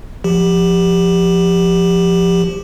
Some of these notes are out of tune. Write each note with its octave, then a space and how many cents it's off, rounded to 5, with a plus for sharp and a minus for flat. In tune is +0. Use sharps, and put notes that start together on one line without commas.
F3 +0 G4 +15